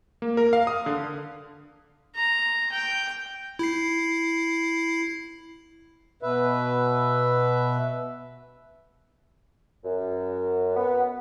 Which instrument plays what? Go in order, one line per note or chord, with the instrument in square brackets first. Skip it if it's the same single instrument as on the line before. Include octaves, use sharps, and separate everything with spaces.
[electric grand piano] A#3
A#4
F5
D#6
D3
[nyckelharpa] A#5
G5
[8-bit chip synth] E4 C7
[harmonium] B2 B4 E5
[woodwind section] F#2
B3